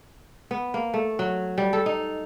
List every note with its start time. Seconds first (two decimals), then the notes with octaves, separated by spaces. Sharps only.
0.51 B3
0.74 A#3
0.94 A3
1.19 F#3
1.58 G3
1.73 A4
1.86 D#4